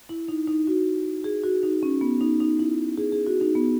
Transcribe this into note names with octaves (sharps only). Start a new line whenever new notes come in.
E4
D#4
D#4
F#4
G#4
F#4
D#4
C#4
B3
D#4
D#4
E4
G#4
G#4
F#4
D#4
B3